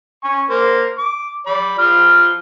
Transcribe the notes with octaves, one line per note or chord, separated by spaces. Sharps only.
G#5 C#6
A#3 C5
D6
D5 B5
F3 B5 F6